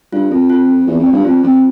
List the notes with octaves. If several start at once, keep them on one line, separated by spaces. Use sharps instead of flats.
G2 F4
F2 A4
F4
C4
E2 F4
F2
D5
G2
F2 F4
F2 C4